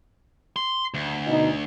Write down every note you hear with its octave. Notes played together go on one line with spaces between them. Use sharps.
C6
D2
B2 D#4